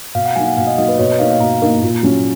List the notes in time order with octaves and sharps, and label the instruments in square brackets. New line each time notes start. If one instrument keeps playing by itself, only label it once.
[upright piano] B2 [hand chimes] F5
[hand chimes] F#5
[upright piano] F#3 A#3 D#4 [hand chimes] G#5
[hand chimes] F#5
[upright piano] B2 [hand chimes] F5
[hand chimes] D#5
[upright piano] F#3 A#3 D#4 [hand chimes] D#5
[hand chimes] B4
[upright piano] B2 [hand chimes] C#5
[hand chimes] D#5
[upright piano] A#3 D#4 [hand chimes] F5
[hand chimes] F5
[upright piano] B2 [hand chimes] A#5
[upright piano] A#3 D#4
A#2
F#3 C#4